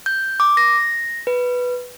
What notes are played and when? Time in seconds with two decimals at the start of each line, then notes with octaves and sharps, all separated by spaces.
0.06 G6
0.40 D6
0.57 A#6
1.27 B4